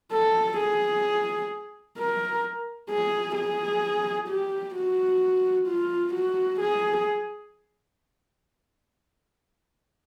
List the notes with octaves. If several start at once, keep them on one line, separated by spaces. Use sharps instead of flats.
A4
G#4
A#4
G#4
G#4
G4
F#4
F4
F#4
G#4